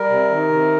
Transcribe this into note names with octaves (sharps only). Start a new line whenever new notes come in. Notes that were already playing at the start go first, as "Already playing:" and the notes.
Already playing: G3 A#4
C3
D#3
C3